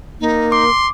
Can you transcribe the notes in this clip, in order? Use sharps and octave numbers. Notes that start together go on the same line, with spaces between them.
A#3 D#4
C6 D6